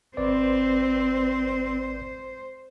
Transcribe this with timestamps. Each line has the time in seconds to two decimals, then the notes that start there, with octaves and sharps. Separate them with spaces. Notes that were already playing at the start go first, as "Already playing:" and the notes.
0.17 G#1 C4 B4 C5 D5